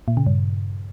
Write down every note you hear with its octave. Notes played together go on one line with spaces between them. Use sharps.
A#2
C#3
G2